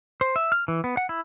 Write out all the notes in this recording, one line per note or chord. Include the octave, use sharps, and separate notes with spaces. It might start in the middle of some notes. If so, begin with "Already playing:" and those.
C5
E5
F6
E3
B3
F#5
E4